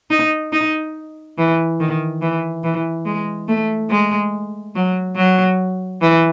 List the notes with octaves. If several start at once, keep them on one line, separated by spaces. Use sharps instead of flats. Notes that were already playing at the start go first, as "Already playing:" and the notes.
D#4
D#4
E3
D#3
E3
E3
G#3
A3
G#3
F#3
F#3
E3